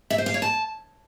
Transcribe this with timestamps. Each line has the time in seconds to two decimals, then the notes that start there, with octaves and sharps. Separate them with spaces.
0.10 E5
0.18 C5
0.26 F5
0.34 C#5
0.42 A5